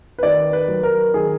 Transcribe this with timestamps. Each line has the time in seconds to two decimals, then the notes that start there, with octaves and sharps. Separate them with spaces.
0.19 B4
0.23 D#3 D5
0.53 B4
0.68 F#3
0.83 A#4
1.14 D#3 G#4